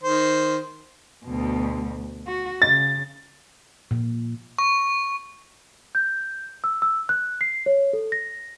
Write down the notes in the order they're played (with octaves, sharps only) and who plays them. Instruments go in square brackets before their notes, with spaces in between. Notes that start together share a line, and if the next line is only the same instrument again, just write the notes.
[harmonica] D#3 C5
[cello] D2 B2
F#4
[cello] C#3 [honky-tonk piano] A6
[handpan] A#2
[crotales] C#6
[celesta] G6
E6
E6
F#6
C7
C#5
A4
A#6